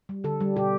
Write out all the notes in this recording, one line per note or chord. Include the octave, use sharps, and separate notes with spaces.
G3
D3 A4
G3
B2 G4